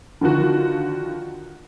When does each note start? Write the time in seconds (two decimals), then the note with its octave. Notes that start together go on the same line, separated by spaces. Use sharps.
0.21 D3 D#3 F3 F#4